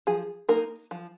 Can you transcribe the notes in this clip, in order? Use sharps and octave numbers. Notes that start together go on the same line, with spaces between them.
F3 G#4
A#3 D#4 A#4
F3